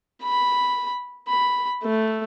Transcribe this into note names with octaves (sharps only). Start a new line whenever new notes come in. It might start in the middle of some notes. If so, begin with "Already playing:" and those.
B5
B5
A3